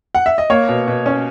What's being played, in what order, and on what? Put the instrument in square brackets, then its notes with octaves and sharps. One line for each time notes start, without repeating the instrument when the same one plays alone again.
[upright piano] F#5
E5
D#5
A#3 C#5
B2
B2
C#4